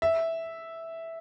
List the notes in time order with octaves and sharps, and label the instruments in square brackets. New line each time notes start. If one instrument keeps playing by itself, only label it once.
[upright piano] E5